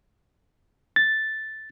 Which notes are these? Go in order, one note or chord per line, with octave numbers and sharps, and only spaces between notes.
A6